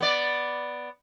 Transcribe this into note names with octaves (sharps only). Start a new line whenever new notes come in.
B3 D5